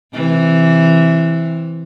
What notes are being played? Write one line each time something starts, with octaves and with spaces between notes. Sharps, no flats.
C3 E3